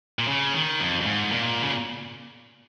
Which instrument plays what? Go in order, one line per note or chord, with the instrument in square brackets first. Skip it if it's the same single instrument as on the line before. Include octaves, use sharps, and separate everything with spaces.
[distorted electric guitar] A#2
C#3
D#3
F2
F2
G#2
A#2
C#3